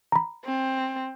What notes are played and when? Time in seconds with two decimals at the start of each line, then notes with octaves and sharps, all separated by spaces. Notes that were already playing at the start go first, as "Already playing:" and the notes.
0.12 A#5 B5
0.45 C4